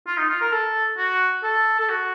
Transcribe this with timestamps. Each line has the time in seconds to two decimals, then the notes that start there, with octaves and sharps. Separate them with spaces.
0.07 F4
0.17 D#4
0.29 F4
0.41 A#4
0.52 A4
0.97 F#4
1.43 A4
1.80 A4
1.89 F#4